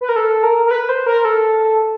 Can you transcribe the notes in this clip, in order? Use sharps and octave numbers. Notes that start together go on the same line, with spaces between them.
B4
A#4
A4
A#4
A#4
B4
C5
A#4
A4